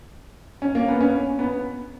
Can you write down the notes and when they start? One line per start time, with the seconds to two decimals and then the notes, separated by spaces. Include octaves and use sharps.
0.62 C#4
0.75 A#3
0.88 B3
1.01 C#4
1.39 B3